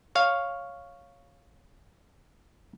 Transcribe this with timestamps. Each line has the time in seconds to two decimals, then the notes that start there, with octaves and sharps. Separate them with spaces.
0.15 C#5 F5